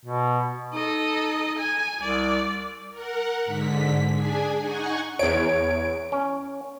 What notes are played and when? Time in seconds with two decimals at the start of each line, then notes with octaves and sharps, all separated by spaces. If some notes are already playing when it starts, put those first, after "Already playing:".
0.05 B2
0.73 D#4 A4 D#5
1.58 G#5
2.02 C2 D5
2.91 A#4 F#5
3.45 G#2 D3 B6
4.12 D4 G#4 G#5
4.59 D#4 F#5 G#5 C#6
5.19 E2 C#5 D7
6.12 C#4